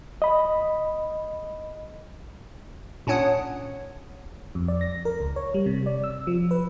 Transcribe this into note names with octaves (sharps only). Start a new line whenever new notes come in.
D#5 B5
A#2 C#4 D4 C#5 F#5 D#6
F2
D5
A#6
A#4
C#2
C#5
G3
C3
D5
E6
F3
B4